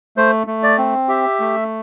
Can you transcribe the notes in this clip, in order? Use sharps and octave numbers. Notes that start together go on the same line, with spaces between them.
A3 C5
A3
D5
C4
G4 E5
A3